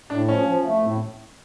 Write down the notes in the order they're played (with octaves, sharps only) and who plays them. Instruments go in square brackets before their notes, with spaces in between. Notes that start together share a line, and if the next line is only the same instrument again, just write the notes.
[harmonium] A2 [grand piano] D4
[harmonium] F3 [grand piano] C#4
[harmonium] F3
A3
A2